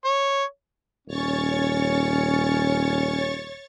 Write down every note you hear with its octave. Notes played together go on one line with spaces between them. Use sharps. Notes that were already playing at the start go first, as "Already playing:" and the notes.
C#5
D#1 C#4 C#5 C#6 A6